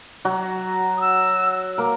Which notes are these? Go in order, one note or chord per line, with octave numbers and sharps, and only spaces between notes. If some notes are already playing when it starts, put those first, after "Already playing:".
F#3 F#4
D#6
E6
A#3 A#4